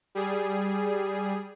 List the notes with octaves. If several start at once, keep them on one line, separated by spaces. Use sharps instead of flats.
G3 G#4